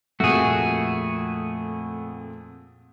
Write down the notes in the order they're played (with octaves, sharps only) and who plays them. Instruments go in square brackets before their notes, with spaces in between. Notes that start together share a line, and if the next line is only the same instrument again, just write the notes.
[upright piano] F2 A#2 [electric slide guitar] A3 [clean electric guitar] F#4 G#4